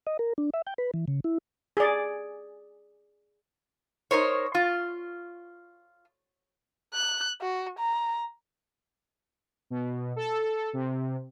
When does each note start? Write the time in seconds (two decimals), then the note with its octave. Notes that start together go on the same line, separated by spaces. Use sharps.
0.07 D#5
0.19 A#4
0.38 D4
0.54 E5
0.67 G5
0.78 B4
0.94 E3
1.08 C#3
1.24 E4
1.77 G#4 D5
4.11 D#4 A#4 C5 C#5
4.55 F4
6.94 F#6
7.41 F#4
7.79 A#5
9.70 B2
10.16 A4
10.73 C3